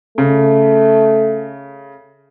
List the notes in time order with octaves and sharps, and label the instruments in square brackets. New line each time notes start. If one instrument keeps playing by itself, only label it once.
[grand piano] C#3 [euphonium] A3